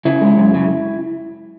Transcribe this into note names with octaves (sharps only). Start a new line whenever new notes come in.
C#3 E4
G#3
F#2
C#3